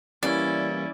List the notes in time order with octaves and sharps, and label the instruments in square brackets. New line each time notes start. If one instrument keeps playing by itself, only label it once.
[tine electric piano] E3 G3 A#3 [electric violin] C#4 E4 [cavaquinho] D5